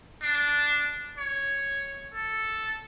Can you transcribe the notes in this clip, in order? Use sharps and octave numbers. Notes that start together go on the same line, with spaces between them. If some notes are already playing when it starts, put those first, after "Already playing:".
D4
C#5
A4